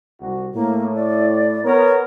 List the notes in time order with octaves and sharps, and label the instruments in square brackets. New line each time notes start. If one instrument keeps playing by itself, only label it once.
[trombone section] C2 F#4
[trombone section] A2 [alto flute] A#3
[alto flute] D5
[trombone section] B3 A#4 [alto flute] C#5